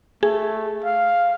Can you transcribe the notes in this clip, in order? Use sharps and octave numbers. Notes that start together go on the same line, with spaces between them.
A3 G#4
F5